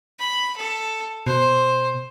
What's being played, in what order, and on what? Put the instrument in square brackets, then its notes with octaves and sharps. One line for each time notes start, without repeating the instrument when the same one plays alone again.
[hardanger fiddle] B5
A4
[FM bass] B2 [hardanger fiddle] C5